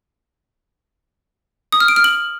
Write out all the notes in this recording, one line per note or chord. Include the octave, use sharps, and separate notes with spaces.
D#6
F6
D7
F6
F#7